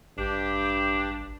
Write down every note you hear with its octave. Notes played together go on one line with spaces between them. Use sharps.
A1 G2 D4 G4